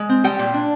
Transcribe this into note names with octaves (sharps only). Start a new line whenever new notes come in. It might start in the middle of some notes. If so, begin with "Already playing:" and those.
Already playing: G#3
C4
G3 G5
A#2
D4